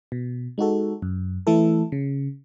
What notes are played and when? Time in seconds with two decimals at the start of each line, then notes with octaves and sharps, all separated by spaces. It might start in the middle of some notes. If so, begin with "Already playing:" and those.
0.12 B2
0.58 G#3 D#4 F#4 A4
1.02 F#2
1.47 E3 A3 E4 A4
1.92 C#3